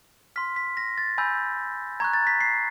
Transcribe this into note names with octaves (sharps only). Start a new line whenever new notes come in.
C6 F6 B6
B6
A#6
A6
G#5 B5 E6 G6
A#5 C#6 F#6 G#6
A6
B6
C7